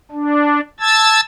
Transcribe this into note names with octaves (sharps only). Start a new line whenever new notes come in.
D4
A5 E6 G#6 A6